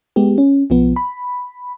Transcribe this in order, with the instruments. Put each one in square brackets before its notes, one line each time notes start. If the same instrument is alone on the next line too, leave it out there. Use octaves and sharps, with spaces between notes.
[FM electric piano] G#3 B3 G4
C#4
B1 F3 B3
B5